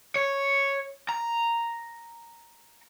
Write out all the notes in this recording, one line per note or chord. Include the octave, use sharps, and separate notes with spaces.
C#5
A#5